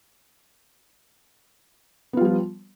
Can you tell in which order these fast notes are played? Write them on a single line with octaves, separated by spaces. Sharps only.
B3 F4 G3 F3